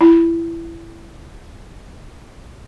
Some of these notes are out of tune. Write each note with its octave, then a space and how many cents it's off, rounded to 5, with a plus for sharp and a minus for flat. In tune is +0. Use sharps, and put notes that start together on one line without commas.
E4 +20